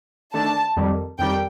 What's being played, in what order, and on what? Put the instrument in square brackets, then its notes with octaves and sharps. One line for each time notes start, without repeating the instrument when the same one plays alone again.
[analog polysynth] D#3 A3 D4 [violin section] A5
[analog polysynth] F2 D#3 G3
[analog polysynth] F2 D#3 G3 [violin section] G5